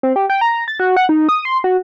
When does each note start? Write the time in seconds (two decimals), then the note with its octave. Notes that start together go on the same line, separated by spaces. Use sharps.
0.03 C4
0.16 G4
0.30 G5
0.41 A#5
0.68 A6
0.80 F#4
0.96 F#5
1.09 D#4
1.29 D#6
1.45 C6
1.64 F#4